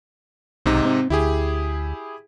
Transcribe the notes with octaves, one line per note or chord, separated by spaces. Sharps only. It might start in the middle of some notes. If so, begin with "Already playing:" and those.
B1 G#2 C3 D#4
C4
D2 E4 G4 G#4